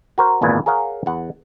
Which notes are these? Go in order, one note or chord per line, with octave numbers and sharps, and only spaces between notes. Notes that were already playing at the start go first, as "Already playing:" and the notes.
F#4 A#4 C5
G#1 E2 A#2 A#3 B4 G#5
G#4 A#4 C#5 F5 F#5
E2 F#5